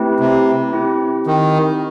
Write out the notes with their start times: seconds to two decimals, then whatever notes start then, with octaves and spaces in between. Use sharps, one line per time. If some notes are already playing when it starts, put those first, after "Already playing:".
Already playing: A3 C4 E4 G4 B4
0.20 C3
0.73 C4 E4 G4
1.26 D#3